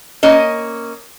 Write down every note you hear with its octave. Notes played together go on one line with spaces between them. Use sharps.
A#3 C#4 D#5